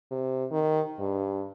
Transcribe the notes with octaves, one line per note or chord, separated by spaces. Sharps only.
C3
D#3
G2